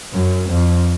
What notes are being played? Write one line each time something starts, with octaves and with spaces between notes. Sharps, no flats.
F#2
F2